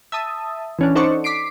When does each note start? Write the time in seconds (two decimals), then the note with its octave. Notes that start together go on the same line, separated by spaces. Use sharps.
0.12 E5 A5 D#6
0.79 E3 C#4 D4
0.95 D#4 A4 C5 D5 F#5 C#6
1.24 D6 B6 C7 D7